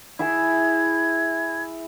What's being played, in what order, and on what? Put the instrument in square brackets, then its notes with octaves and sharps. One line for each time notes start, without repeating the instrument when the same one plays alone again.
[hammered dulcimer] E4 G#4 E5 [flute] G#6